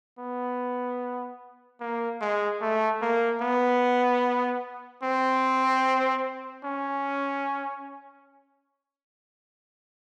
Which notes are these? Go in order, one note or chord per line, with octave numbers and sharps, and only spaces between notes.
B3
A#3
G#3
A3
A#3
B3
C4
C#4